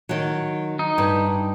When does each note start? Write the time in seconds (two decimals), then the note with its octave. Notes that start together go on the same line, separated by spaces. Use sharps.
0.09 D#3 F#3
0.79 D#4
0.98 G2